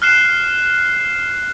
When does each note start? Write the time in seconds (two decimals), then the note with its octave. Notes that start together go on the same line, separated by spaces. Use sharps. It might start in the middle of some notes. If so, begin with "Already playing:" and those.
0.02 F6 F#6 C7 E7